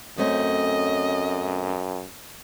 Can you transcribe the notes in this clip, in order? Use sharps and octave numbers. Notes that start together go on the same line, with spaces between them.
F#2 A3 C4 C#4 D#5